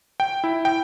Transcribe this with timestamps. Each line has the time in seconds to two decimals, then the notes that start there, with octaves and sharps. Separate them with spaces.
0.20 G5
0.44 E4
0.65 G5